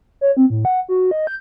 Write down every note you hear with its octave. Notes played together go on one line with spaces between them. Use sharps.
C#5
C4
A2
F#5
F#4
D#5
G6